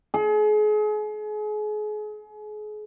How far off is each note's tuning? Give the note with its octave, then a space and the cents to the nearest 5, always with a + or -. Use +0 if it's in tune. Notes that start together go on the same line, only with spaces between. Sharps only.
G#4 +35